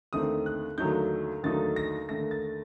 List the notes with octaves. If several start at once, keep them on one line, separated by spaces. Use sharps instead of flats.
D#2 D3 A3 C4 D#4 D#6
F#6
D#2 D3 F#3 A3 D#4 G6
D#2 D3 F#3 A3 D#4 A6
A#6
D#2 D3 A3 A#6
A6